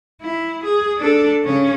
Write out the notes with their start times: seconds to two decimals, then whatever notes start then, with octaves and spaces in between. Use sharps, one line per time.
0.22 E4
0.65 G#4
0.98 D4 A4
1.43 C#3 C#4